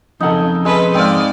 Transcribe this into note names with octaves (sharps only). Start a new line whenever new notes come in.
F2 C#3 D#4 A4 F#5
G#3 C#4 A4 B4
G#2 G#3 C4 D5 F5